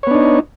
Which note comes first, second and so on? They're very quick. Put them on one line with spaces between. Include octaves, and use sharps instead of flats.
C#5 B3 D4 D#4